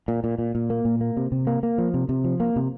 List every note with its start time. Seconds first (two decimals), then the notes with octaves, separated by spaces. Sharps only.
0.08 A#2
0.24 A#2
0.39 A#2
0.55 A#2
0.70 A#3
0.85 A#2
1.01 A#3
1.17 C3
1.32 C3
1.47 A#3
1.63 A#3
1.78 F3
1.94 C3
2.09 C3
2.24 F3
2.40 A#3
2.56 C3